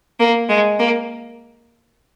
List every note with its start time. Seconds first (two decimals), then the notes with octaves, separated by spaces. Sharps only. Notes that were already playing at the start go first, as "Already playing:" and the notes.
0.20 A#3
0.49 G#3
0.79 A#3